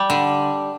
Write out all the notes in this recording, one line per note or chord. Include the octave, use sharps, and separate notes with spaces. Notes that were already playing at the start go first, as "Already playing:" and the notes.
Already playing: G3
D3